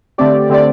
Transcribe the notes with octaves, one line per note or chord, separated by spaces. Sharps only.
D3 A3 C4 G4 D5
D3 A3 C4 G4 D5